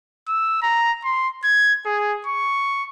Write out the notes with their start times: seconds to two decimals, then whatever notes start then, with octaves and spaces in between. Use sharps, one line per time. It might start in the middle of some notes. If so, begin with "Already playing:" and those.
0.28 E6
0.62 A#5
1.04 C6
1.44 G#6
1.86 G#4
2.26 C#6